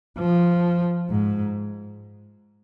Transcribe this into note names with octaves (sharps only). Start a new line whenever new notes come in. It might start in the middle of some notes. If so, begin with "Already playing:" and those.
F3
G#2